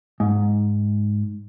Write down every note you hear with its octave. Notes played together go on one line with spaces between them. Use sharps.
G#2